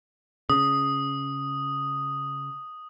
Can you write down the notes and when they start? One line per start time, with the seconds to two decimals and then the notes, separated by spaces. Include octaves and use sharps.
0.50 C#3 D#6